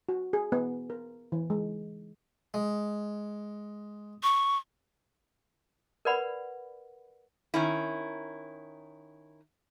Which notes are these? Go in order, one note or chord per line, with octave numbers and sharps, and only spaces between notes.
F#4
G#4
B3
A#4
E3
G#3
G#3
C#6
A#4 B4 D5 F#5 B5
D#3 C#4 E4